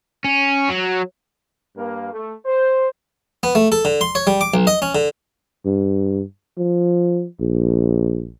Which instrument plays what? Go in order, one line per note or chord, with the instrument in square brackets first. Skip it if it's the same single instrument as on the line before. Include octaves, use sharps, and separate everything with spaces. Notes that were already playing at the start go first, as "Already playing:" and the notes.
[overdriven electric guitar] C#4
F#3
[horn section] G2 A#3
A3
C5
[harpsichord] B3
A3
A4
D3
C6
C#5
G3
D6
B1
D#5
C#4
D3
[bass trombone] G2
F3
A#1